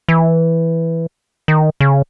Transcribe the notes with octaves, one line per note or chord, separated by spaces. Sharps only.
E3
D#3
C#3